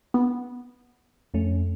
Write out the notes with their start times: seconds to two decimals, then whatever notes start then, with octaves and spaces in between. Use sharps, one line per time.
0.14 B3
1.34 F2 A3 C#4